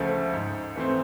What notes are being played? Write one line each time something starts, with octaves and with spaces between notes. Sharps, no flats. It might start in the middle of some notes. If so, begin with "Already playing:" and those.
Already playing: D2 C#3 F3 A3
G#2
E3 A3 C4